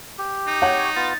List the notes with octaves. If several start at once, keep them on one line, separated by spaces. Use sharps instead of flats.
G4
D#4
C#5 F#5
B3 F4 A6